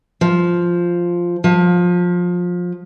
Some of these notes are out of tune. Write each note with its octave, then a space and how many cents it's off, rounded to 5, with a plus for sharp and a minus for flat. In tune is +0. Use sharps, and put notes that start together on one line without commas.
F3 +0
F3 +20